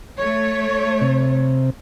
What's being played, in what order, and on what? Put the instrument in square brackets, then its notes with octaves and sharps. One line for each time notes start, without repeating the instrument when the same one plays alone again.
[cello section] A3 C#5
[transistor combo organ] C3